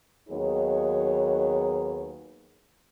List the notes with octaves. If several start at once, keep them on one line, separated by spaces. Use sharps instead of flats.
D#2 F#3 B3 D#4 G#4 C#5